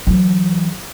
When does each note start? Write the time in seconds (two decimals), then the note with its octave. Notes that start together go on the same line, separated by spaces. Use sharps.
0.07 E3 F#3